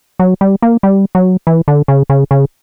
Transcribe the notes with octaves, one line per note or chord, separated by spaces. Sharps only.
F#3
G3
A#3
G3
F#3
E3
D3
C#3
C#3
C#3